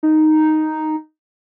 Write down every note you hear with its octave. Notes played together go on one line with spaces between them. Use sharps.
D#4